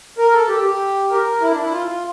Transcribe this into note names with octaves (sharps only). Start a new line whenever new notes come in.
A#4
A4
G4
G4
A#4
E4
D4
E4
F4
F4